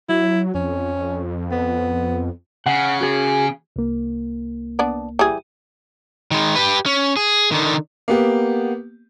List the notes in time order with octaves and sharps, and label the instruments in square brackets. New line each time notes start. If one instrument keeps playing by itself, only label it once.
[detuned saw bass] F#3 [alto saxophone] E4
[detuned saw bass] F2 [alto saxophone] C#4
[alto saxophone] B3
[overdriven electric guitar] C#3 [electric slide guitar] F#5
[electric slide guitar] F#4 G#4
[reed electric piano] C2 A#3
[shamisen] B3 D4 D5
E3 G3 G#4
[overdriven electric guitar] D#3 G#3
G4 B4
C#4
G#4
D3 D#3
[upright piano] A#3 B3 G4